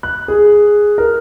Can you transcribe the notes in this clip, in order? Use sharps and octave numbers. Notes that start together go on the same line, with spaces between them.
F#6
G#4
A#4